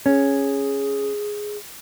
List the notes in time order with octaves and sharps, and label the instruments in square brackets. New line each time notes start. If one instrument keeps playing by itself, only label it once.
[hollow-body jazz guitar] C#4 [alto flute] G#4